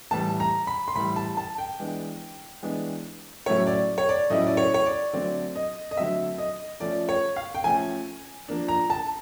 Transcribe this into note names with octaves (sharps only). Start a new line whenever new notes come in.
A2 E3 G3 A5
A#5
B5
C6
A2 E3 G3 B5
A5
A5
G5
E3 G#3 B3 D4
E3 G#3 B3 D4
A2 F#3 A3 C#4 E4 C#5
D5
C#5
D5
A2 F#3 A3 C#4 E4 D#5
D5
C#5
C#5
D5
D3 F#3 A3 C4 D5
D#5
D#5
D3 F#3 A3 C4 E5
D#5
F3 A3 C#4 D5
C#5
F5
G5
F3 A3 C#4 G#5
F3 A#3 D4
A#5
A5